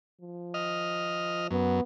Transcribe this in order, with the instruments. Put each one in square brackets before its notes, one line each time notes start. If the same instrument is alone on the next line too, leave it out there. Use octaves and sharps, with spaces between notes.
[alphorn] F3
[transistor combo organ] D#5 F6
[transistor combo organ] F#2 [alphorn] B3